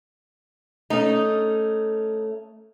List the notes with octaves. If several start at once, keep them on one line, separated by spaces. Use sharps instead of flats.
A3 C#4 D#4